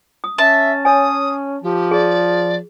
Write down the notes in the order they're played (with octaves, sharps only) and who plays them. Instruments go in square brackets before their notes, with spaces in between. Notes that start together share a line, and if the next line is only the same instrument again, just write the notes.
[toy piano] D#6
[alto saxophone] C#4 [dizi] E5 [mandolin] A5
[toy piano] C#5 G#5 [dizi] D#6
[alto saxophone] F3 [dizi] G4
[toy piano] G#4 [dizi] D5